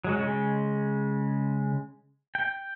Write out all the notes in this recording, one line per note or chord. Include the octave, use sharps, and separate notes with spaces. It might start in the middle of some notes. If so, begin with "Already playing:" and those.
F#3 G#3 F#4
C#3 G#3
G5